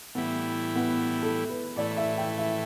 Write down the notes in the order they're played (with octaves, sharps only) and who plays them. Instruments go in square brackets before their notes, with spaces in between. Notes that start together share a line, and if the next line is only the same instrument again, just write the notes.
[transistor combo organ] A2 E3 G3 E4 [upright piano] B3
[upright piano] B3
A4
B4
[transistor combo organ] A2 E3 A3 [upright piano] D5
[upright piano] E5
G5
E5